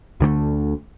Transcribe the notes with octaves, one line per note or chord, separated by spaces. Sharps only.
D2 D3 D#3 A3